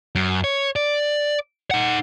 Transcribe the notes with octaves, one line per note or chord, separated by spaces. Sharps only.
F#2
C#5
D5
D#4 F#5